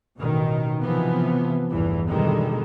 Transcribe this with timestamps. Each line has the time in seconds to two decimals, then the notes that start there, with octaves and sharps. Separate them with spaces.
0.18 A1 B2 D#3
0.82 C3 E3 F3 B3
1.71 A1 E2 G2 E3
2.09 G2 B2 D3 D#3 G3 G#3